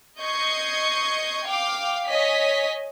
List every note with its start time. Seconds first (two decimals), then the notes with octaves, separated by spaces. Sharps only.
0.20 D#5 C#6 G6 G#6 C7 C#7
1.46 F5 G5 D6
2.06 C#5 D#5 G#5 B6